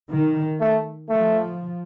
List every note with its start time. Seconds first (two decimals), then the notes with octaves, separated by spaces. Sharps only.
0.10 D#3
0.60 A3
1.09 F3 A3